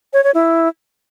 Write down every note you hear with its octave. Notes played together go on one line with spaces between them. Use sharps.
C#5
C#5
E4